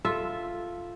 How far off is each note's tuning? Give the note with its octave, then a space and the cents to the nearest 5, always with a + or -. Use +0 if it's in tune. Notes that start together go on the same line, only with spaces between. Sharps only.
F4 +0 A4 +0 E5 +0